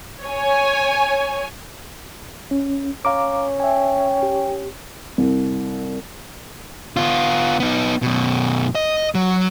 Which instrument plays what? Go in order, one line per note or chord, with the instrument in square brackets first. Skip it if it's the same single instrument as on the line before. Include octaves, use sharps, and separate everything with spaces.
[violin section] C#5 G#5
[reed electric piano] C#4
[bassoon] C#4 [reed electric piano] F5 A#5 D6
[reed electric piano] E5 G#5 [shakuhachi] G5
[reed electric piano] G4
[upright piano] C2
[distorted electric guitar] B3 F4
B3 D#4
F#2 B2
D#5
F#3